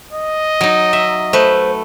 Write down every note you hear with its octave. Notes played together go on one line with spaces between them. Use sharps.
D#5
F#3 D#4
E5
A3 B4 C5